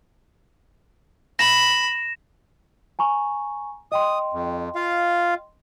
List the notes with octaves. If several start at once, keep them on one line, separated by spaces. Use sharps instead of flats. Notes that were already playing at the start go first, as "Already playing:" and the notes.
B5 A#6 E7
G#5 A#5 C#6
D#5 G5 C6 D#6
F2
F4 F5